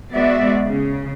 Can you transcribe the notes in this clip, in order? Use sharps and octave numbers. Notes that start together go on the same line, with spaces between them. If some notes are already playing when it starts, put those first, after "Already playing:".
G#3 B3 F#4 D5 E5
C#3